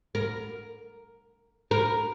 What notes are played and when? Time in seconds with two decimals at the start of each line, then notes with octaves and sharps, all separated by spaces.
0.15 A#4
1.71 A#4